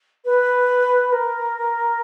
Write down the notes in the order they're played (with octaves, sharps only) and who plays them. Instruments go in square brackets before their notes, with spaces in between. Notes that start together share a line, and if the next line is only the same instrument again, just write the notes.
[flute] B4
A#4